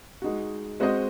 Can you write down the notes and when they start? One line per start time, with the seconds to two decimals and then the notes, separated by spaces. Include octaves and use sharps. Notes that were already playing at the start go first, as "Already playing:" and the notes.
0.22 G#3 D#4 F#4
0.80 G#3 C4 F#4 C5 D#5